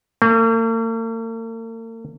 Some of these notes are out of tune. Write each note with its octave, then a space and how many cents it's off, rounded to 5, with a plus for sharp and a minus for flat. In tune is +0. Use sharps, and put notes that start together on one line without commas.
A#3 -45